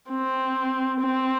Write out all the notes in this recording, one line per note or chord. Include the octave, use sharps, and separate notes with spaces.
C4
C4